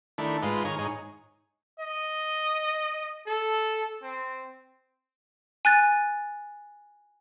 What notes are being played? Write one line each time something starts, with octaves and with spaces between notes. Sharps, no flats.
D#3 A3 D4 E4
G#2 G#3 F4 B4 C6
D#3 G#4 C#5 A#5
G#2 D#4 G#4 C#5
D#5
A4
C4
G#5 F#6 A6